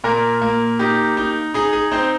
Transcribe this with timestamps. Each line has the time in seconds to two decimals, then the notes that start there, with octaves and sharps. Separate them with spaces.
0.04 A#2 A#3 A#4
0.42 A#3
0.79 D#4 G4
1.17 D#4
1.54 D#4 G#4
1.73 G#4
1.92 C4 D#4 C5